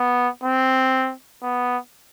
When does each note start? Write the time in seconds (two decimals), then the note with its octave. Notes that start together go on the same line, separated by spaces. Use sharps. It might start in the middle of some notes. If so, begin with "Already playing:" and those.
Already playing: B3
0.44 C4
1.43 B3